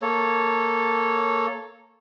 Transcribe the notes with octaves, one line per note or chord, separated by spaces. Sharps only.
A#3 A4 C#5